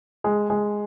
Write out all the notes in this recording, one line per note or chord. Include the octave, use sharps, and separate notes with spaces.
G#3
G#3